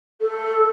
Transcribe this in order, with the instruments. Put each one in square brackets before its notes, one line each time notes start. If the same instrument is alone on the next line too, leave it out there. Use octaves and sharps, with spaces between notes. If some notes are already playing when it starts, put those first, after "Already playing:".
[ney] A4